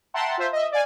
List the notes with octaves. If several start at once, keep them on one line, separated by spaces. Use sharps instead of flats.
E5 F#5 G5 A5 A#5 C6
F4 C5 E5
D#5 E5
D5 F5 G#5